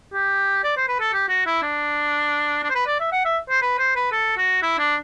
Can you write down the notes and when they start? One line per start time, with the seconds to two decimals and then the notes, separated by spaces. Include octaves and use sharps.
0.13 G4
0.64 D5
0.77 C5
0.88 B4
1.00 A4
1.13 G4
1.29 F#4
1.46 E4
1.62 D4
2.63 D4
2.70 C5
2.75 B4
2.87 D5
3.00 E5
3.12 F#5
3.25 E5
3.50 C5
3.62 B4
3.79 C5
3.96 B4
4.12 A4
4.37 F#4
4.62 E4
4.79 D4